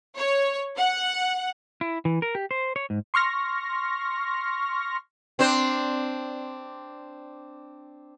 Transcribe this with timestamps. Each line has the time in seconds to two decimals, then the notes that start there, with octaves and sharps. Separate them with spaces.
0.17 C#5
0.77 F#5
1.81 E4
2.05 E3
2.22 A#4
2.35 G4
2.51 C5
2.76 C#5
2.90 G#2
3.14 C6 C#6 F6 A#6
5.39 C4 D4 C5